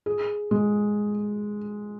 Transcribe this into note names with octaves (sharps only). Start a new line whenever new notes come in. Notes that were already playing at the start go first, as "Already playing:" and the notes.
G#4
G#3